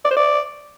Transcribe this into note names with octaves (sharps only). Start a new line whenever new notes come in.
D5
C5
D5